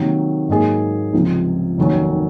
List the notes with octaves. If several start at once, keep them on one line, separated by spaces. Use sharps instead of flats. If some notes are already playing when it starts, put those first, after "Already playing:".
Already playing: C3 D#3 F#3 A#3
G#2 F#3 A#3 D#4 G#4
C#2 C3 F3
F1 D#2 D#3 F#3 C#4